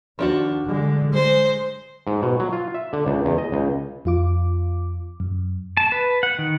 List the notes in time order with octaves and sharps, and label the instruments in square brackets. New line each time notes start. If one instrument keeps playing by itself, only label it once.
[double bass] D#2 [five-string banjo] F3 D4 F#4
[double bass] D3 G#3
[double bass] G#3 [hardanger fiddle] C5
[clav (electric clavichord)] G#2
B2
F#3
F4
E5
D3
C#2
E2
D#5
C#2
[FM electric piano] F2 F4 D6
F#2
[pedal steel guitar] A5
B4
F#5
D#3